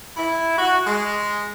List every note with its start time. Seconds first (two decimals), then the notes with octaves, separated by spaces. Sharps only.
0.17 E4
0.57 F#4
0.86 G#3